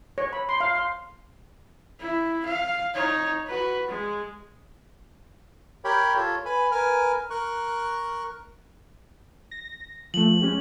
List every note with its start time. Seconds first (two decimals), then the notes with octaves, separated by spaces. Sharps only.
0.18 C#5
0.33 B5
0.49 C6
0.60 F5
0.75 C6
2.00 E4
2.45 F5
2.94 D#4 C#5
3.46 F#4 B4
3.88 G#3
5.85 G4 A#4 C#5 G5 B5
6.16 F4 A4 C#5
6.45 B4 G#5 B5
6.71 A#4 B4 G#5 F6
7.30 A#4 C#6 F#6
9.51 A#6
10.14 F3 A3 F#7
10.42 G#3 C#4 G4